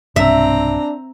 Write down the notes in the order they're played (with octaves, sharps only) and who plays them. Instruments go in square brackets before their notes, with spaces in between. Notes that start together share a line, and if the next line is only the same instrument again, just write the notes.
[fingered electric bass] B1 G2 C3 [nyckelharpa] C4 A#5 [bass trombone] D4 [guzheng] E5